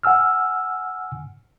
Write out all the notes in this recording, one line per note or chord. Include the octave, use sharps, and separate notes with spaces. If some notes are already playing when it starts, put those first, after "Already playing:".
F#5 G#5 E6 F6